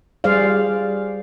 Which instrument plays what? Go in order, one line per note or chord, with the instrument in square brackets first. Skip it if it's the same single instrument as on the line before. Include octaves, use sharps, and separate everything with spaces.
[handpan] G3 G#4 C5 D5 F5